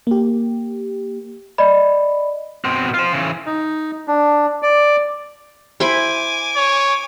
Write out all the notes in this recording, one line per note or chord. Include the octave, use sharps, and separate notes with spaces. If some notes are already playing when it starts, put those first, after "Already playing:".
A#3 G4
D5 D#5 B5
B2 C4
F4 C5
C#3 E3
D#4
D4
D5
E4 C5 G#5 B5 D6
C#5